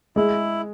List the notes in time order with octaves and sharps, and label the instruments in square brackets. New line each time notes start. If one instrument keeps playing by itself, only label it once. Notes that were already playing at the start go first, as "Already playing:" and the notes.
[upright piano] G#3 [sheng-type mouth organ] E4